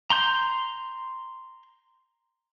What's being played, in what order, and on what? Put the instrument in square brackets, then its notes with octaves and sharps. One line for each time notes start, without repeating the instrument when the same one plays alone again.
[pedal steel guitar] A#5 C6 G6